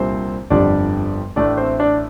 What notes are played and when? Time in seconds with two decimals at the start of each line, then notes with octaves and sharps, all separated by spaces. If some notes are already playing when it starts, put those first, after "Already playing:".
Already playing: C2 A#2 G3 C4 D4 C5
0.50 G1 F2 D3 G3 D4 D5
1.36 A1 A2 A3 D4 D5
1.58 C4 C5
1.80 D4 D5